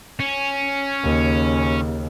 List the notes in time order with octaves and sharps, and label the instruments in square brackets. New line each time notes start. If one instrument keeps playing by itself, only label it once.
[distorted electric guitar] C#4
[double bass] D#2 C#3